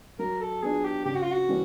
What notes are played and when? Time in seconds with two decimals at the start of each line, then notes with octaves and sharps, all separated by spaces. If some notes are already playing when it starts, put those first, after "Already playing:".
0.19 F#3 A#4
0.41 A4
0.62 B3 D4 F4 G#4
0.85 G4
1.05 C#3 G4
1.15 F#4
1.23 F4
1.32 F#4
1.49 E3 G3 A#3 C#4